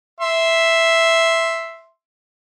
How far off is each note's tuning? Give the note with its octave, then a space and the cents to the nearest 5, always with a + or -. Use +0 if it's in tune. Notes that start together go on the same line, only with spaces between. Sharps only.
E5 +0 C6 +0